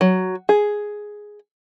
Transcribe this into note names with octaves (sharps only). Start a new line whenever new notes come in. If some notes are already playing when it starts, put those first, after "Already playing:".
F#3
G#4